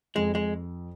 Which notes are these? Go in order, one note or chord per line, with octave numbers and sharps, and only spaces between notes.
F2 G#3
G#3